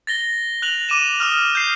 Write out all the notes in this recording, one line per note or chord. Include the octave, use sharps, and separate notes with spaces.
A6 A#6 G7
F#6 F7 F#7
D6 D#7 E7
D6 D#6 F6
G6 C7